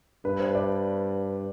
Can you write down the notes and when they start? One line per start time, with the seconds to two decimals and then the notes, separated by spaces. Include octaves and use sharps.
0.25 G2 B4
0.40 C5
0.55 D5